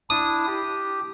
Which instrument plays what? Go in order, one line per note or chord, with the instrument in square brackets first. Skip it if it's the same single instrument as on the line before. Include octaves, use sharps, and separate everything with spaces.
[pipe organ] D4 E4 [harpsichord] D#6
[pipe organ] G4